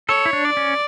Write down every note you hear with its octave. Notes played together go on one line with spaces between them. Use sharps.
A4 C#5
E4
D4
D5
C#4